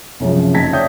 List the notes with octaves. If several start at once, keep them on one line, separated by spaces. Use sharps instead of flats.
C2 F#2 C#3 F3
F#1 D#4 A5 G#6 A#6 B6
C#5 D5 E5 G5 D#6 G6